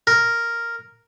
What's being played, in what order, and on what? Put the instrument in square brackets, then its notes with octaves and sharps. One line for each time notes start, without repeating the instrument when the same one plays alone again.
[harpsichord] A#4